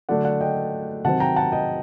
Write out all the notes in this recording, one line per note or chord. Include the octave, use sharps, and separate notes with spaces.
D3 F#3 A3 D4 D5 F#5
D5 F#5
D#5 G5
C3 D#3 F#3 C4 F#5 A5
G5 A#5
F#5 A5
D#5 G5